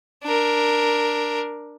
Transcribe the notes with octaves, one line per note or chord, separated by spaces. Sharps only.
D4 A#4